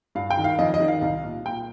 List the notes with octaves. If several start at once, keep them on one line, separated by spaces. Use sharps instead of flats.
G2 F5
G5
D#3
F5
F2 D#5
D#5
D#3
F5
C2
A#2
A#2 G5